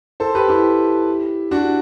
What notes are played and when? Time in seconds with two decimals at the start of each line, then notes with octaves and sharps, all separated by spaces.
0.20 A4 C5
0.35 G4 B4
0.49 E4 G4
1.51 D4 F#4